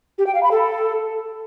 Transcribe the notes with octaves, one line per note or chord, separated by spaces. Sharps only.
G4
G5
F5
B5
A4